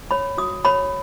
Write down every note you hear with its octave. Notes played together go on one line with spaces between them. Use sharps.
C#5 B5
F#4 D#6
C#5 B5